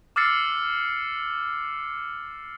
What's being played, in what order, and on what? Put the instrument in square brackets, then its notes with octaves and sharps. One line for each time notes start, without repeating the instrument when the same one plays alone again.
[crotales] D6 E6 F6 A6 C7 C#7